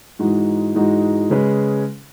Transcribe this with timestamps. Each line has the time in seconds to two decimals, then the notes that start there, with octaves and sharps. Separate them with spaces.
0.19 G#2 E3 G#3 D#4 F#4
0.75 G#2 E3 G#3 D#4 F#4
1.30 C#3 G#3 C#4 G#4 B4